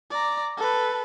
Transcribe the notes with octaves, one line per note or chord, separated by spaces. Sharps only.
D5 A#5
A4 B4